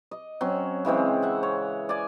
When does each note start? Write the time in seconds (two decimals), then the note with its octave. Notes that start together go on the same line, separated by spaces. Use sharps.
0.11 D#5
0.41 F#3 C4 C#4
0.85 C#3 E3 G#3 C4
1.22 E5 F#5
1.43 C#5
1.89 D5 G#5